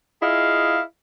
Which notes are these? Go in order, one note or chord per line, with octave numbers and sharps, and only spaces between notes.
E4 F4 G#4 D#5 F5